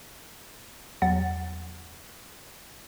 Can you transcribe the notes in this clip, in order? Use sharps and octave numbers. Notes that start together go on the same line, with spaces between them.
E2 F#3 F#5 A6